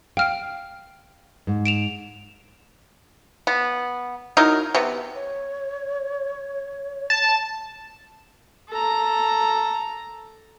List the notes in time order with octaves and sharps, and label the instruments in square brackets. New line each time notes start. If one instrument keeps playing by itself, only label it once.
[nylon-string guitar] F5 [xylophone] G5 F6 D7
[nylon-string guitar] G#2
[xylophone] D7 E7 F7
[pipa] B3
F#3 D#4 E4 A#4
C3 B3
[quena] C#5
[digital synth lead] A5
[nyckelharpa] A4 A#5